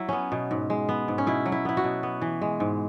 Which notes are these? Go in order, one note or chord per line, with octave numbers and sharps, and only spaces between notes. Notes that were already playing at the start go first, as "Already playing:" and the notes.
Already playing: F#3 E4
B3 C#4
B2
G#2
G#3
B3
G#2
C#4
B2 E4
F#3
E4
B3 E4
F#4
B2
B3
E3
G#3
G#2